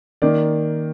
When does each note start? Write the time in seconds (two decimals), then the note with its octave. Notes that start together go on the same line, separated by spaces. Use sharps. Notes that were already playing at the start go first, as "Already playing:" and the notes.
0.22 D#3 A#3 D5